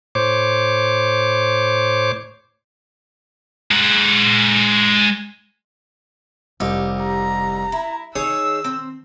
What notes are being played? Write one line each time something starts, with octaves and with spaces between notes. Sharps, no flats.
A2 C5 C#5 D6
G#3 F#5
F1 C2 D#4 G4
A#5
E4
D#3 D#4 G#4 C#5 D#6 E6
C4